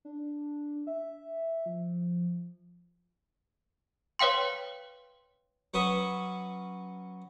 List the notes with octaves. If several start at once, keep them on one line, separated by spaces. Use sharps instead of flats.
D4
E5
F3
B4 C#5 F5 G5 C6
F#3 C#4 B4 C#6 D#6